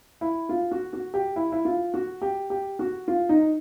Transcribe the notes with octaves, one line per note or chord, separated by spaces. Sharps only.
E4
F4
F#4
F#4
G4
E4
E4
F4
F#4
G4
G4
F#4
F4
D#4